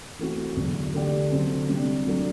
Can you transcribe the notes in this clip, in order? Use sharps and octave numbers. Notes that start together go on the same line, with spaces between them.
E3 A3 C4 F#4
E2 D3 F#3
D3 A3 D4 G4 D5
D3 F#3 C4
C3 G3 D4
F#3 A3 D4